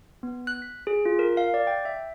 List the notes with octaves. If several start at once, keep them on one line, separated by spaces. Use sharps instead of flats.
B3
F#6
B6
G#4
F4
A#4
F5
D5
G5
E5